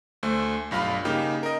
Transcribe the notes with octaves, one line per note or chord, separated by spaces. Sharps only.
D2 A3 C5
B1 G2 F4 F5 B5
C#3 A#3 D#4 G4
A#4 D#5